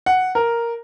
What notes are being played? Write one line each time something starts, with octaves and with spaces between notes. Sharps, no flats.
F#5
A#4